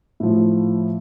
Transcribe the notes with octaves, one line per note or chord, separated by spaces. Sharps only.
A2 F3